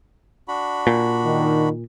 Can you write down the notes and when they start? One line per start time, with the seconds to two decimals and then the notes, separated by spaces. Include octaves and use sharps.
0.48 D4 F#4 B5
0.87 A#2
1.25 D#3